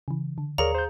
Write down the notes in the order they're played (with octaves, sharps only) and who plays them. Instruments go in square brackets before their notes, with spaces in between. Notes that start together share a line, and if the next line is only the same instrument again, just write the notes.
[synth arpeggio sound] C#3 E3
D3
[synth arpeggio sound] D#2 F5 C#7 [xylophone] G#4 A#5 [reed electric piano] A#4 C#5 D5
[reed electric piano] C5 G6